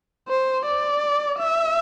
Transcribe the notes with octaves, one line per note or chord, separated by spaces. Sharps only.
C5
D5
E5